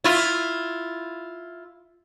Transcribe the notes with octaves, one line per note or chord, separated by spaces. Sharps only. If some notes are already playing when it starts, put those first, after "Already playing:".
E4 F4